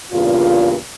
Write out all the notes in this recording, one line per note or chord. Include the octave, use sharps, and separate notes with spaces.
E2 G2 A#2 C#3 F4